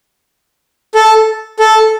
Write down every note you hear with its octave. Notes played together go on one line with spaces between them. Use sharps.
A4
A4